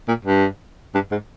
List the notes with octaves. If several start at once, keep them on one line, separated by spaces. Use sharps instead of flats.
A#2
G2
G2
G#2